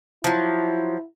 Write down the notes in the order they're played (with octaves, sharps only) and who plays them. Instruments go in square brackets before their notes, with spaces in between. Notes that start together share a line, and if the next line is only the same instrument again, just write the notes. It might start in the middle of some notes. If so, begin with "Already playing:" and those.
[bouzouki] F3 F#3 [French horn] E4